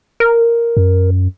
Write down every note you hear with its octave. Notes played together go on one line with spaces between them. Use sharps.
A#4
F#2